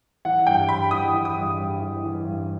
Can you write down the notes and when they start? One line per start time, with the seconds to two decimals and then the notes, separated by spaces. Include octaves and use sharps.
0.25 E3 F#5
0.47 G2 G5
0.69 G2 B5
0.91 E3 D#6
1.13 E3
1.25 D#6
1.36 G2
1.58 G2
1.80 E3
2.03 E3
2.25 G2